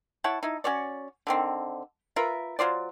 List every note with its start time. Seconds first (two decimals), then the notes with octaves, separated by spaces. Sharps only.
0.24 E4 C#5 F#5 A5
0.43 D#4 E4
0.64 C#4 F#4 C#5 D5
1.27 D3 D#3 C4
2.16 F4 A#4 B4 E5
2.59 F#3 F4 C5 D5